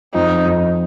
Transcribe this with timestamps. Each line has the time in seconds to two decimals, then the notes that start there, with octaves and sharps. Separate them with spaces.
0.14 F2 D#4
0.45 F2